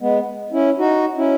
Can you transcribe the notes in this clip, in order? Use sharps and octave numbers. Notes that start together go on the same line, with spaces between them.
G#3 B3
C#4 E4
D#4 F#4
C#4 E4